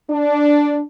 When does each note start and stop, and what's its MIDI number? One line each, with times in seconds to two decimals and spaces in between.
0.11 0.81 62